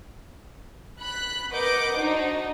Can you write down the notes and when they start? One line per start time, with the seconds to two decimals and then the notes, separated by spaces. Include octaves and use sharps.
1.00 B5 F#6
1.53 A#4 B4 D#5 F#5 D6 G6
1.98 D4 D#4 F#4 C5